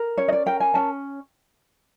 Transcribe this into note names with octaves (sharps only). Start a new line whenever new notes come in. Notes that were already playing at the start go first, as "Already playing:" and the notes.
Already playing: A#4
C#4 C#5
D#5
D5
A#4 G5
G#5
C#4 A5